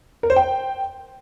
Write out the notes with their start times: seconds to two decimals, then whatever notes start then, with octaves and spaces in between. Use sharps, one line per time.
0.23 A#4
0.30 C5
0.36 G5